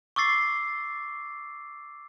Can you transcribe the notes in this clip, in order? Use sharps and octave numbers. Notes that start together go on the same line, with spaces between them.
C#6 D6 E6 A6 C7